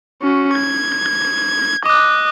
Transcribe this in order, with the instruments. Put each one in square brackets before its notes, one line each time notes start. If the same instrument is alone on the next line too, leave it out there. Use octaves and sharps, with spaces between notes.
[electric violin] C#4 F#4
G#6
[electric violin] D#5 [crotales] D6 F#6